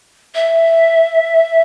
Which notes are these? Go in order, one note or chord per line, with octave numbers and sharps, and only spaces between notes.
E5